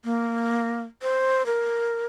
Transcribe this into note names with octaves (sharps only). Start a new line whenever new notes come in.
A#3
C5
A#4